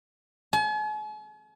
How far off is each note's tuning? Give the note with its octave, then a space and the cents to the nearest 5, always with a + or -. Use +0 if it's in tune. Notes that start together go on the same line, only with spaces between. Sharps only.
G#5 +45